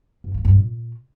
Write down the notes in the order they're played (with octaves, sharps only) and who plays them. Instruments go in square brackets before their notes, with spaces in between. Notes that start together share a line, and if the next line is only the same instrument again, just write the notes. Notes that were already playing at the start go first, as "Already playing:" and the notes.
[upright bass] G2
A#3
G2
A#2